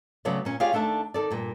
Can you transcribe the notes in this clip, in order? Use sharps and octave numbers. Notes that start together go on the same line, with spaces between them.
C#3 F#3 A3 B3 C#5 D5
A#2 C#4
F4 G4 G#4 C#5 D5 F5
D#2 A3 D4 E5 A5
D#3 A4 D5
G2 A#2